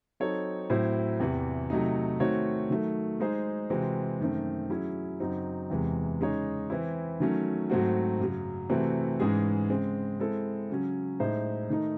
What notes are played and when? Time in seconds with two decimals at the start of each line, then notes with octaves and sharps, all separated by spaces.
0.20 F#3 C4 D#4 A4 C#5
0.70 A2 F#3 C4 E4 C5
1.20 E2 C3 E3
1.70 C3 F#3 A3 D#4
2.20 D#3 A3 C4 F#4 C#5
2.70 D#3 F#3 A3
3.20 G#3 D#4 G#4 C5
3.70 C3 E3 G#3 C4 F#4
4.20 F#2 D#3 A3 C4
4.70 F#3 C#4 E4 G#4
5.20 F#2 C#3 F#3 C4 D#4
5.70 E2 C3 E3 G#3
6.20 C#3 G#3 D#4 G#4 C#5
6.70 E3 C4 E4
7.20 D#3 F#3 A3 C#4
7.70 G#2 F#3 A3 C4 F#4
8.20 F#2 C#3 F#3
8.70 C3 E3 A3 C4 F#4
9.20 G#2 E3 G#3 C#4 G#4
9.69 C#3 G#3 C4
10.20 G#3 C4 E4 A4
10.70 C#3 F#3 C#4
11.19 A2 G#3 D#4 G#4 C5
11.70 D#3 A3 D#4